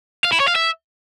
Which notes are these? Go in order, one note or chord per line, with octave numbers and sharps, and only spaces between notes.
F5
E4
C#5
F5
E5